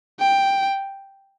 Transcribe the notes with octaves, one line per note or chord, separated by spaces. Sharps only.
G5